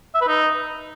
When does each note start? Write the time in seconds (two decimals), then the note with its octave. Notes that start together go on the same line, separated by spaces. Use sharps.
0.15 E5
0.21 B4
0.28 D#4